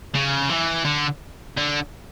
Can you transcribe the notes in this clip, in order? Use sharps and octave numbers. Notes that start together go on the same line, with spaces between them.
C#3
E3
D3
D3